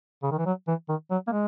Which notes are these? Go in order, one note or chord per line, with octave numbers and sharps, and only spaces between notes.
C#3
D#3
E3
F#3
E3
D#3
F#3
A#3
G#3